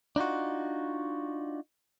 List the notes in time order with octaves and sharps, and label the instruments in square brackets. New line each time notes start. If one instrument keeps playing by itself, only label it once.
[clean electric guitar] D4 D#4 F4 F#4